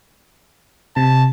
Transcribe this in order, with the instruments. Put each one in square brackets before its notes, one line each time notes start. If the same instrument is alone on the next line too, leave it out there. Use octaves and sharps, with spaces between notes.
[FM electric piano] C3 [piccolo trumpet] A5